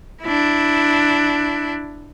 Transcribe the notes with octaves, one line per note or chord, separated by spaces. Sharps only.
D4 E4